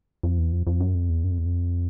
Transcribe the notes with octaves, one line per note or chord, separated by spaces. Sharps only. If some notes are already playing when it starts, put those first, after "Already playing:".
F2
E2
F2
F2
F#2
F2
E2
F#2
F2
E2
F2